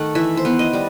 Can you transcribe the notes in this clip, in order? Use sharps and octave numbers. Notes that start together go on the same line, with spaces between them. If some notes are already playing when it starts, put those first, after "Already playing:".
Already playing: D#3 A3 F#5
E3 E5
C5
B3
D#5
G3